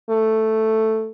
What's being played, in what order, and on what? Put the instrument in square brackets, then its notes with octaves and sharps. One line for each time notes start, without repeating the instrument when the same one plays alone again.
[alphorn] A3